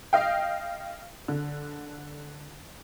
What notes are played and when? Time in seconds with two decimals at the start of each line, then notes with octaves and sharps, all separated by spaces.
0.13 D#5 F5 G5
1.28 D3